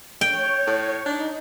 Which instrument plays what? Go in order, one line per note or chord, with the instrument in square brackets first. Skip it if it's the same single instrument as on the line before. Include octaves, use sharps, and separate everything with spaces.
[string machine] C#5 [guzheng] G5
[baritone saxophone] A2
[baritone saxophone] D4 [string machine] D#4